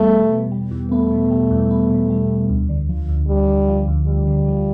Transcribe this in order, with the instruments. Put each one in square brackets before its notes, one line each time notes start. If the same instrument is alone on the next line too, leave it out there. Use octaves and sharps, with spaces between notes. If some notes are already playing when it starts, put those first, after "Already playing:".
Already playing: [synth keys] E2 B2 G3 B3 [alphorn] A3
[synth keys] B3
B2
G3
E2
[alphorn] A3 [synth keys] B3
[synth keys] B2
G3
E2
B3
B2
G3
E2
D2
D3
F3
D2
[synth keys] D2 [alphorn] G3
[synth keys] D3
F3
D2
[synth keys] D2 [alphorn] G3
[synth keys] D3
F3